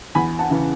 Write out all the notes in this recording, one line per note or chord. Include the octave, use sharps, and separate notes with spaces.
E2 G#5 B5
F#5 A5
C#3 E3